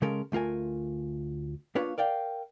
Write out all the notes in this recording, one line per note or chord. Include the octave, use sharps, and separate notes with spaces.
C#3 G#3 C#4 A4 A#4
D2 A3 F4 A#4 G#5
A#3 D4 F4 B4 C#5
A#4 D5 F5 G5